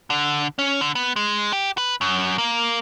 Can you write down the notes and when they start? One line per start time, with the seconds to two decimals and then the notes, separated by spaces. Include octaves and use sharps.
0.10 D3
0.59 C#4
0.81 D3
0.95 B3
1.16 G#3
1.53 G4
1.78 B4
2.01 F#2
2.38 A#3